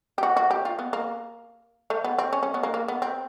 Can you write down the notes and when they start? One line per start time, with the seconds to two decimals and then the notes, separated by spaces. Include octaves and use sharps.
0.18 G4
0.23 F#4
0.37 F#4
0.51 G4
0.65 F4
0.79 B3
0.93 A#3
1.90 A3
2.04 B3
2.19 C4
2.33 C#4
2.43 C#4
2.54 B3
2.63 A#3
2.74 A#3
2.88 B3
3.02 C4